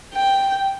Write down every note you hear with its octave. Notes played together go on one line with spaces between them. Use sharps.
G5